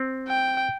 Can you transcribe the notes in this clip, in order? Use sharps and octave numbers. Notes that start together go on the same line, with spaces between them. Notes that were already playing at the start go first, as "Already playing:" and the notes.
Already playing: C4
G5